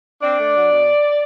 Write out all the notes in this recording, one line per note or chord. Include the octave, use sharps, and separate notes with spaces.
C4 D4 D5
A3
F#3
B2